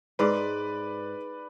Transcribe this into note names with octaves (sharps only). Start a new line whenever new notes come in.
G#2 B4 D5